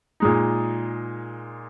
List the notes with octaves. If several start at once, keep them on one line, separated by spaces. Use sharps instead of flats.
A#2 G#3 D#4